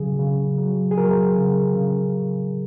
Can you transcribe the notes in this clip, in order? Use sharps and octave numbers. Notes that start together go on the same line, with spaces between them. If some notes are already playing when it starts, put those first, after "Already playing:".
Already playing: C#3 F#3 G#4
C#3
F#3
G#4
F#3 A#4
C#3
C#3